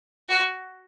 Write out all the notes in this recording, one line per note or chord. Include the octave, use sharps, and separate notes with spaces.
F#4